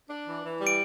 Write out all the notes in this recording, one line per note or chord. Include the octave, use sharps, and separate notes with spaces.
D4
E3
E3
G3
D7